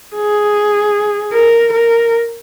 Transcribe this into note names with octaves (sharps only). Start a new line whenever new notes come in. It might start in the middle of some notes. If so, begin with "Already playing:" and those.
G#4
A#4
A#4